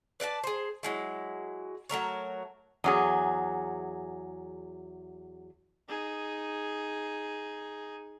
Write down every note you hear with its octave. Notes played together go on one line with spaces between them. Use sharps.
B4 D5 F5 A5
G#4 C5
F#3 G#3 E4
F#3 A3 A#4 C#5
E2 F#3 G#4
D#4 G#4